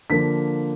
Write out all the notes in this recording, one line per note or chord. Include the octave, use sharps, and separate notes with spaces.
D3 F3 A#3 B6